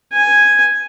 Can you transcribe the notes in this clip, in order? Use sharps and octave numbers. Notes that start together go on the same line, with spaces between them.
G#5